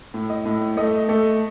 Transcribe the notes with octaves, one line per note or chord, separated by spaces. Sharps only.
A2
D#5
A2
A3 D#5
A3